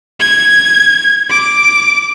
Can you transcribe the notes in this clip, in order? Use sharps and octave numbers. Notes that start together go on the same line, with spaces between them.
G#6
D6